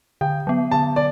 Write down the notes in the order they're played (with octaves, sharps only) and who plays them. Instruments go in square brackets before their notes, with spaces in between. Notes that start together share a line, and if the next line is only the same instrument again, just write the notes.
[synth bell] D3 [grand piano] G5
[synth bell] F#3 B3
[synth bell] D3 [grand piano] A5
[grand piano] D5